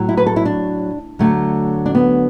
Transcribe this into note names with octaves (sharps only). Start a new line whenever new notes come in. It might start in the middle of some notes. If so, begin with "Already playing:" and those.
Already playing: A2 F#3 A3
E4
B4
A4
E4
D4
D2 D3 F#3 A3
D4
B3